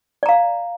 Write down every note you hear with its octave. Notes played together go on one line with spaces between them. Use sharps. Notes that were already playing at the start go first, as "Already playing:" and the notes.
D5 F5 A#5